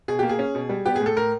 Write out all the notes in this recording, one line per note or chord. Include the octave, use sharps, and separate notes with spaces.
B2 G#4
A#3 G4
G#4
C#4
B2
G3
B3 G4
G#4
A2
A4
A2 A#4